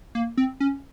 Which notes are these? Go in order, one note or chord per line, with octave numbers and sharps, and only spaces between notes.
A#3
C4
C#4